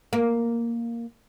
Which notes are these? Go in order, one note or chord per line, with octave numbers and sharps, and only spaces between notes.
A#3